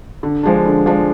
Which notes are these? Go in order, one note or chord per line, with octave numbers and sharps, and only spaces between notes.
D3
F3 G#3 D4
D3
F3 G#3 D4